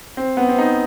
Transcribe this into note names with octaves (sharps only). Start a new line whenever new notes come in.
C4
B3
C4
D#4